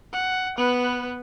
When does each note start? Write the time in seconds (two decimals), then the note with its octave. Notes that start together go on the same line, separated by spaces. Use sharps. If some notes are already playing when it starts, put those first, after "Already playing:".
0.13 F#5
0.57 B3 B4